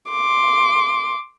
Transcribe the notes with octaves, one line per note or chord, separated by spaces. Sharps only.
C6 D6